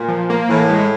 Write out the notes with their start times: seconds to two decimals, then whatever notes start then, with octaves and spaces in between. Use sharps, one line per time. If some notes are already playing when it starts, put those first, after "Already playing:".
Already playing: A#2
0.08 F3
0.30 A#3
0.49 A2 E3
0.69 G#3